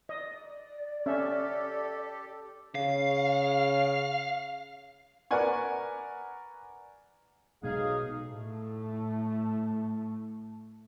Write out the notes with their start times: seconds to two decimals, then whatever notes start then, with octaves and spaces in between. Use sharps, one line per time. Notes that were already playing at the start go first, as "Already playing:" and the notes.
0.09 D5 D#5
1.06 C#4 G4 A4 E5
2.75 C#3 F5
5.31 A#4 B4 D5 F#5 G#5 C#6
7.63 B1 B2 G#3 B3 D#4 G#4 F5
8.28 A2 A3